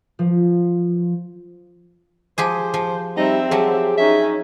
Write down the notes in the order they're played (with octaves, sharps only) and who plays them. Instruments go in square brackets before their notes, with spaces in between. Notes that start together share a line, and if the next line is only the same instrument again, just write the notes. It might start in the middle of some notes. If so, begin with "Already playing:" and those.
[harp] F3
[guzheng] F3 G4 G#4 [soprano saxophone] C5
[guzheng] F3
[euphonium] G3 [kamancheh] C4 E5 [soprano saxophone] D#4
[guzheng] F3 F#3 [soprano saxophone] G4 [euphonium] G#4
[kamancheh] C#4 D#4 [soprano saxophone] E5